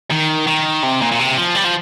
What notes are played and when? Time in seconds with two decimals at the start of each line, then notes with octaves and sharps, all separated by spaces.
0.11 D#3
0.47 D#3
0.83 C3
1.01 A#2
1.12 A#2
1.19 C3
1.37 F3
1.56 G3
1.65 F3